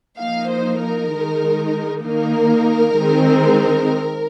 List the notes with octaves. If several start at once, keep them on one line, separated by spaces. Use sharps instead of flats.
F3 A#3 D#4 F5
C5
A#4
D#3 G#3 D#4
D#3 A#3 D#4 A#4
D#3 G#3 C4 D#4